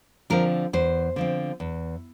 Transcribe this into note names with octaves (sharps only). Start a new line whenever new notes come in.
D3 F3 C4 A#4
E2 C5
D3 F3 C4
E2